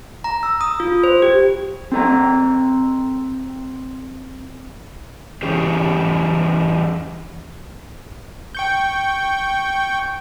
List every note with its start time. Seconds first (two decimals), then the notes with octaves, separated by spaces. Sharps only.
0.24 A#5
0.43 E6
0.61 D#6
0.80 F4
1.04 C5
1.22 G4
1.92 C4 A4 A#5
5.43 E3 C#4 G4 G#4
8.55 G5 C#6 G6